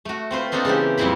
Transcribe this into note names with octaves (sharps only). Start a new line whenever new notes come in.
A3 F#4
C4 F4 B4 C5
A#3 C4 D4 D#4 A4
C#3 E3 C4 G4
F2 A#2 G3 C4 E4 B5